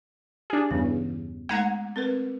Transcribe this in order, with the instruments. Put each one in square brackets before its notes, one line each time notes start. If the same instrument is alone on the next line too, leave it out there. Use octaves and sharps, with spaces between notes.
[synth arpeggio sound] D4 G#4 [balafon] G4
[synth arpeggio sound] E2 G2 C#3 [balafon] B3
[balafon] G#3 A3 D#4 [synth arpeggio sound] F#5 A#5 G#6
[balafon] C4 A#4 B4